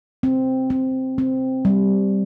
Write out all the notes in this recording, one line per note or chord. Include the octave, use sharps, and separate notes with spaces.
C4
C4
C4
G3